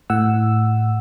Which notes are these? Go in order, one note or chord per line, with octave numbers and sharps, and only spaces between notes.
A2 F#5 E6